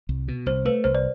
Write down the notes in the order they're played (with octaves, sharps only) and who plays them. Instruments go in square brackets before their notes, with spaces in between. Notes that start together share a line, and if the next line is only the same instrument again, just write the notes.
[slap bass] C2
B2
[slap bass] C2 [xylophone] C5
[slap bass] A3 [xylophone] B4
[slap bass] C2 [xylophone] C5
[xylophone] D5